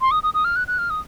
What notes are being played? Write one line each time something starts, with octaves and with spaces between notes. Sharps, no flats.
C6
D#6
D#6
D#6
F6
F#6
F#6
F6
D#6